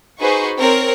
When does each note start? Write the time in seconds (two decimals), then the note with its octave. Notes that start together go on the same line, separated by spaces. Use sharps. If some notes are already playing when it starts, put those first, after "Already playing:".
0.20 D#4 F#4 G#4 B4 C5 C#6
0.57 C4 A#4 C#5 A#5